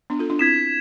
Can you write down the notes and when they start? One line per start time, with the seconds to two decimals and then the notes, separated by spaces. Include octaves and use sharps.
0.10 B3 D4
0.19 F4 A4
0.30 D4 F4
0.39 C4 E4 G#6 B6 E7